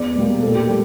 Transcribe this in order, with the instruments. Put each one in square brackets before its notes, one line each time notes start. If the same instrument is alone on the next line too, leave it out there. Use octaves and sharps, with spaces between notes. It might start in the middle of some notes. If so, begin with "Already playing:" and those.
Already playing: [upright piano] E2 D5
B2 G3 A#3
A#2 A4
G4
G3 G4